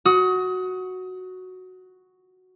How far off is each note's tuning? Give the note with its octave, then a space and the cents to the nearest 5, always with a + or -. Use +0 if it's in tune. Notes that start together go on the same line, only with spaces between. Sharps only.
F#4 +0 D#6 +30